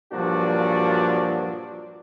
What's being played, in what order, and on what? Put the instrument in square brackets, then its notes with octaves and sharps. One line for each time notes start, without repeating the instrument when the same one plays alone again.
[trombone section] G2 A#2 F3 F#3 D4 F#4